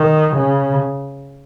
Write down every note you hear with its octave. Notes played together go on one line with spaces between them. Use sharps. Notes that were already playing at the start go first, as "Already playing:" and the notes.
Already playing: D#3
C#3